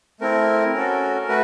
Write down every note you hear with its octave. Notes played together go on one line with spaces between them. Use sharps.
A3 C4 E4 A#4
C#4 F#4 A4
A3 F#4 B4